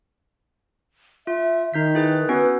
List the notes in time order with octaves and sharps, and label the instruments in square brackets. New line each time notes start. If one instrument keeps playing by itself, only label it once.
[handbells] F4 [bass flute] E5
[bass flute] D#3 [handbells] D#4 G6 B6
[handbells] E4 G#4 B4
[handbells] B3 C#4 F#4 [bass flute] B4